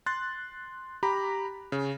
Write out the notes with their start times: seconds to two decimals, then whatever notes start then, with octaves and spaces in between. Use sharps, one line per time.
0.06 C6 F#6 A6
1.03 G4 A#5 B5
1.72 C#3